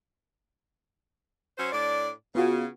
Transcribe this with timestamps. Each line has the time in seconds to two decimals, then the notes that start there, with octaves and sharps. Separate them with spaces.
1.58 F#3 C#4 C5
1.72 A2 D4 D5
2.35 C#3 B3 F4 F#4